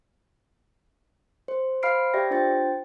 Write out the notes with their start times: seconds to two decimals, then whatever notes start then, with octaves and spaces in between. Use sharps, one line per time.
1.48 C5
1.83 C5 F5 B5 F6 C7 D7
2.14 G4 D5 E5 G5 A#6
2.31 D4 F4 C5 G5 A6